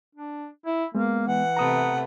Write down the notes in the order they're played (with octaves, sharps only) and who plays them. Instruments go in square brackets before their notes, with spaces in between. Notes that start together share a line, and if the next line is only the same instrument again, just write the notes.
[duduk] D4
E4
[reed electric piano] G#3 B3 [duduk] A#3
[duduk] E3 [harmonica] F#5
[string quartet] C3 A3 B3 [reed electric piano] A#5 D#6